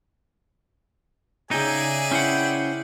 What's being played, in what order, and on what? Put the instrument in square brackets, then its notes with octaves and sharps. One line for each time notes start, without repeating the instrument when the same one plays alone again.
[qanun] C#3 G5 [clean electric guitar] D#4 [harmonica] G#4 D5 E5 [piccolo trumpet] G#5
[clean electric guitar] C#4 C5 F#5 [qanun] E4 [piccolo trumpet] G5